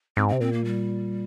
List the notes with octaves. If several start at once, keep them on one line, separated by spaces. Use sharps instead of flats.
G#2 C4
C4
C3
A#2 C4
A#3
G3